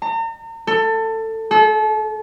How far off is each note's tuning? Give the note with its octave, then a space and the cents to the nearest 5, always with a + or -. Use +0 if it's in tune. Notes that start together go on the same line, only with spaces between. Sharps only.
A#5 -40
A4 +20
A4 -35